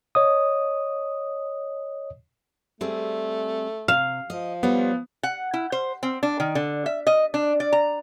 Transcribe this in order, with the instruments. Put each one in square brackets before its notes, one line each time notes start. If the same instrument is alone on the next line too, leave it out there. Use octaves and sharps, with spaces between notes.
[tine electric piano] C#5 D#5 D#6
[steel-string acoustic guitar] G3 C4 G#4 [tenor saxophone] A3
[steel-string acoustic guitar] C3 [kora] F5
[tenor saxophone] F3 [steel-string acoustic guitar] D#5
[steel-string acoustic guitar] G3 C5 C#5 [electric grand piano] B3
[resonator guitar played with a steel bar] F#5
E4
C5
C4
D4
D#3
D3
E5
D#5
D4
D5
A#5